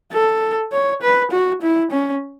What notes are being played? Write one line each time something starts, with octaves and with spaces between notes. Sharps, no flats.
A4
C#5
B4
F#4
E4
C#4